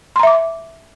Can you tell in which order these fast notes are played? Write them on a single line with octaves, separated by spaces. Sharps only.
C6 A#5 E5 D6